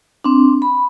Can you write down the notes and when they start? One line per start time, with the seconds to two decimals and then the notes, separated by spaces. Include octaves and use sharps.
0.24 C4 D4
0.62 B5